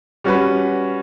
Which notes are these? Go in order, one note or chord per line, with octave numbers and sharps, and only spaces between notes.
G3 C#4 F#4 B4